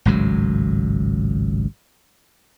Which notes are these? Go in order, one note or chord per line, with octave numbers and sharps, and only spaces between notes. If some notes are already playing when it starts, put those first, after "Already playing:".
G#1 C#2 A2 F#3